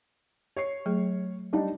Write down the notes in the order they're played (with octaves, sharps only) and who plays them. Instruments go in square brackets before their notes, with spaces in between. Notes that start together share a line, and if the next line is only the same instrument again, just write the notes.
[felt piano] C#5 C7
[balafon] F#3 A3 G#4
[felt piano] G3 D4 D#4